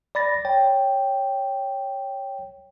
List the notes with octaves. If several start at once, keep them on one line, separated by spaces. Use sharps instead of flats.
D5 B5 A6 A#6
C#5 G5